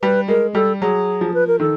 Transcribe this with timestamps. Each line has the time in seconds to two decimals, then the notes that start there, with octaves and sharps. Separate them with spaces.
0.02 G3 B4
0.28 G#3 A#4
0.55 G3 A4
0.81 F#3 G#4
1.21 F3
1.34 B4
1.47 A#4
1.60 D#3 A4